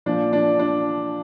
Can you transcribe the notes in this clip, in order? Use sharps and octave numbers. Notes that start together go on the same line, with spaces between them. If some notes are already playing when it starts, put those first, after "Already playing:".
A#2 F3 D4
D4
D4